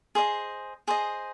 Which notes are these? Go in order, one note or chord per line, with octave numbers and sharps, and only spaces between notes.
G#4 C5 D#5
G#4 C5 D#5